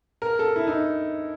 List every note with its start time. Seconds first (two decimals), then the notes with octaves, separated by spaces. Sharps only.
0.22 A#4
0.39 A4
0.56 E4
0.67 D#4